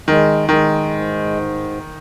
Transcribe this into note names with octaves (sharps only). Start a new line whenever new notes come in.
D#3 G#3
D#3 G#3
G#2